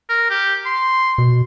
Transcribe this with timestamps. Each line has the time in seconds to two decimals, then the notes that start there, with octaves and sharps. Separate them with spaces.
0.09 A#4
0.30 G4
0.66 C6
1.18 B2